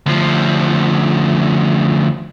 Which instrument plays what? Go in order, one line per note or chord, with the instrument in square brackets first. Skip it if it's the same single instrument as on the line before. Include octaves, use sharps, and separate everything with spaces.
[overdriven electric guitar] D2 F3